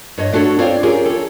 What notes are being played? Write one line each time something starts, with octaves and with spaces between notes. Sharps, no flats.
G2 C#5 D#5
A3 D4 F#4 A4 C#5 F#5
C4 F4 C#5 D5 F5
C#4 F4 G4 G#4 A#4
A4 C#5